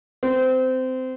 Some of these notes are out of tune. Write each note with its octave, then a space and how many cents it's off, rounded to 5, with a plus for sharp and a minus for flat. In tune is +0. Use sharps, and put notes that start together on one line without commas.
C4 -20